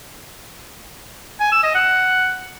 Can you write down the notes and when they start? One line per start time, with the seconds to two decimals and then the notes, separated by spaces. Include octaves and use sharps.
1.40 G#5
1.52 E6
1.63 D#5
1.75 F#5